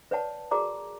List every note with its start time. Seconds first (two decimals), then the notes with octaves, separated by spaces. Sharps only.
0.11 B4 C#5 D5 F#5 A5
0.51 F#4 G#4 A#4 D5 A#5 D6